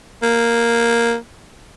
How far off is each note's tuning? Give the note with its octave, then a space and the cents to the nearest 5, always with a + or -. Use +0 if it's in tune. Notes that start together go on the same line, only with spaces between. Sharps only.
A#3 +0